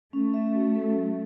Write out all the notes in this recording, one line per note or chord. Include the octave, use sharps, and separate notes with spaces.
A3 C#4
E5
F#4
A4
F#3